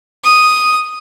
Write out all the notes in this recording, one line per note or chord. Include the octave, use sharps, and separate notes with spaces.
D#6